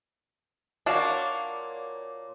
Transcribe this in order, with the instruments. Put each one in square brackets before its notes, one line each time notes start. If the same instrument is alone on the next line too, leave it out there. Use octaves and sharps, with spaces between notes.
[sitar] A#2 A#3 C#5 [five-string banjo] D4 F#4 F5